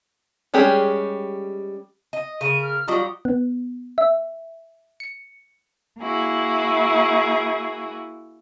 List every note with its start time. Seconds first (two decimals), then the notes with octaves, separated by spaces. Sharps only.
0.54 G3 G#3 C#4 G4 G#4
2.13 D#5
2.41 C#3 A#4 D#7
2.63 F6
2.88 F#3 G3 D#4 F4 D#6
3.25 B3
3.98 E5
5.00 C#7
6.01 A#3 E4 F#4 G#4